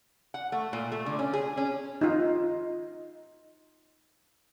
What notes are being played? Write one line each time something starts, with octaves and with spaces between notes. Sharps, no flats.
F#5
A3
A#2
A3
D3
C#4
G#4
C#4
D#4 F4